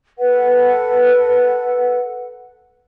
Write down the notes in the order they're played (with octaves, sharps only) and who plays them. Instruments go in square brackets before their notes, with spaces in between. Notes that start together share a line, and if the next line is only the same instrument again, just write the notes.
[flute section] A4 B4 F#5